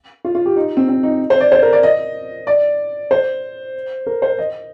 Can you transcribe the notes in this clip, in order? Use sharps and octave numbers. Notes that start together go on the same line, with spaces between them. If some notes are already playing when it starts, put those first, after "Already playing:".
F4
F4
G4
D#4
C4
C4
D#4
C5
D5
C5
A#4
D5
D#5
D5
C5
A#4
C5
D#5